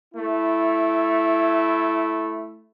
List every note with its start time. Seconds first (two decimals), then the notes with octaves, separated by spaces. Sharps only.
0.14 A3 E4